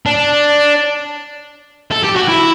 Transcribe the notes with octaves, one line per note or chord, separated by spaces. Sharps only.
D4
A4
G4
F#4
E4